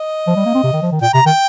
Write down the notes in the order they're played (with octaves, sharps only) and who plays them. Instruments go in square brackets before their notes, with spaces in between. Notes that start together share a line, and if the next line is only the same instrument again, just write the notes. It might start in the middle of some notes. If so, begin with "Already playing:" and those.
Already playing: [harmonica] D#5
[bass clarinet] F3
G3
A#3
C4
C3
D#3
F3
D#3
[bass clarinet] A#2 [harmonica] G5
[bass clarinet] C3 [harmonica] A#5
[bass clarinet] D#3 [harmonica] G5